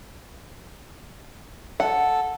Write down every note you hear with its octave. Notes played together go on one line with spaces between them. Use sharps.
A4 F#5